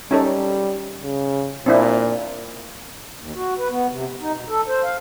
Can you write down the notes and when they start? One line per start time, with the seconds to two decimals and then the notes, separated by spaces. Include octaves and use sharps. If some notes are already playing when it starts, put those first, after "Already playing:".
0.11 G3 C#4 D#4 A4
1.03 C#3
1.66 A#2 C4 D4 E4
3.19 D#2
3.35 F#4
3.58 B4
3.69 B3
3.89 C3
4.06 C3
4.21 D#4
4.36 B2
4.49 A4
4.68 C5
4.84 F5